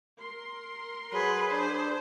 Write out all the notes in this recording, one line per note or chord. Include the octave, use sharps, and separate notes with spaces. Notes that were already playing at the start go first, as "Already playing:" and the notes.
A#4 C6
F#3 G#4 B4
D4 C5